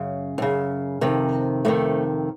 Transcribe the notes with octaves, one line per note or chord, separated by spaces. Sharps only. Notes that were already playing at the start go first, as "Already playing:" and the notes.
Already playing: F#2 C#3
F#2 C#3
F2 C3 D#3
F2 C3 D#3 A3